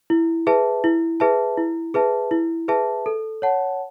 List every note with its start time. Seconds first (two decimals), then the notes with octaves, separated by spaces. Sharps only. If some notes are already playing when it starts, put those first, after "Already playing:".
0.10 E4
0.47 G#4 B4 E5 A5
0.84 E4
1.20 G#4 B4 E5 A5
1.57 E4
1.94 G#4 B4 E5 A5
2.31 E4
2.68 G#4 B4 E5 A5
3.06 A4
3.42 C#5 F#5 A5